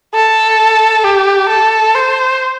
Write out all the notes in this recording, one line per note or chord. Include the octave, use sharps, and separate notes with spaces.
A4
G4
A4
C5